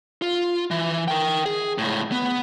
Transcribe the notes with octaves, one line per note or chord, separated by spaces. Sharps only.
F4
E3
A#4 G5
G#4
C#2 A2
B3